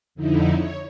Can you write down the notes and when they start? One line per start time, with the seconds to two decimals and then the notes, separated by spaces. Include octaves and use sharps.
0.15 F2 D3 D#4 E4
0.51 C#5